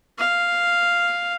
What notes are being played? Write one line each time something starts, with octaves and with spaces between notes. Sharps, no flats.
F5